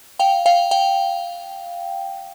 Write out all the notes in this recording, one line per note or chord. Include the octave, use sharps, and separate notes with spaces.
F5 G5
F5 G5
F5 G5